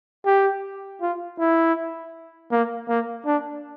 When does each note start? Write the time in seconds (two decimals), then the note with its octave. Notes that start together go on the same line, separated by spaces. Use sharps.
0.26 G4
1.01 F4
1.39 E4
2.51 A#3
2.89 A#3
3.26 D4